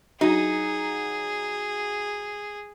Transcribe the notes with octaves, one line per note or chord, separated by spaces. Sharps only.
F#3 D#4 G#4